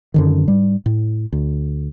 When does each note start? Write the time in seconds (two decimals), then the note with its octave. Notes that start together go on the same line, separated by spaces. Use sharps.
0.14 F#2 D3 D#3
0.48 G#2 G3
0.86 A2
1.32 D2